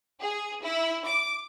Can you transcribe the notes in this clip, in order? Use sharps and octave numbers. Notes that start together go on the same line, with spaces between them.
G#4
E4
D6